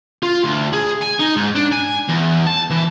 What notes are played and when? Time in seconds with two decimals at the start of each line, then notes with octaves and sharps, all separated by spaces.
0.23 F4
0.44 D2
0.73 G#4
1.03 G#5
1.20 D#4
1.36 G#2
1.55 D4
1.72 G#5
2.08 E2
2.47 A5
2.70 E3